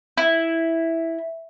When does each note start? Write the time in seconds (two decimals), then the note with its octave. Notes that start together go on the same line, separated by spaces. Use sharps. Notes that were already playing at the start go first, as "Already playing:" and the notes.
0.17 E4